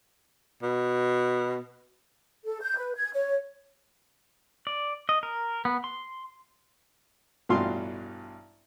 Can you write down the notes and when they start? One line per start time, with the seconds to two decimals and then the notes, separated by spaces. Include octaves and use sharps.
0.63 B2
2.45 A4
2.62 G6
2.77 B4
2.96 G#6
3.14 C#5
4.67 D5
5.09 D#5
5.23 A#4
5.65 B3
5.84 C6
7.49 A1 G2 B2 F4 F5 C6